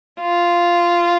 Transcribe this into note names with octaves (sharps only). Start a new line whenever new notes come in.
F4